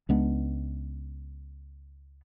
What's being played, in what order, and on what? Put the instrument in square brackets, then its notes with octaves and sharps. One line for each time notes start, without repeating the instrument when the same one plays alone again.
[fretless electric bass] C#2 G#3 B3 D4